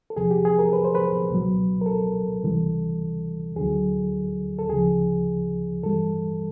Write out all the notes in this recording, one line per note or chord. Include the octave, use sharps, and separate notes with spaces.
A4
E2 C3 F3 G#4
G4
G#4
A#4
B4
C5
B4
C#2 B2 F#3
A#4
A4
C#2 C3 E3 G3
D2 D3 F#3 G#4
A4
D2 C#3 F3 G#4
G2 E3 G3 A4